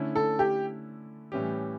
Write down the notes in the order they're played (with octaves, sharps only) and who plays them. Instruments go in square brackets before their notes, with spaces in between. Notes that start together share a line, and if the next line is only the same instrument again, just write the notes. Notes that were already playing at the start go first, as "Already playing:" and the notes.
Already playing: [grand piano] D3 A3 C#4 E4
[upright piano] A4
G4
[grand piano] A2 E3 G3 C#4 G4